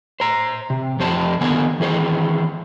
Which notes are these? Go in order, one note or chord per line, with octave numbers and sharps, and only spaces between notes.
C5 A#5
C3
F2 G4 C5 A5
D3 D#3 A#3 B3 G#5
D#3 E3 G#4 C5